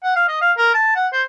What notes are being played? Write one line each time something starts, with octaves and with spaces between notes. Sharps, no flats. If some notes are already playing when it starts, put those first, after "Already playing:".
F#5
F5
D#5
F5
A#4
A5
F#5
C5